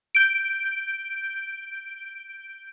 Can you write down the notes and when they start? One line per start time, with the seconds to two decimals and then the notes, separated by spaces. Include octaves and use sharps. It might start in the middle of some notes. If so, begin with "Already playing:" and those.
0.15 G6 D7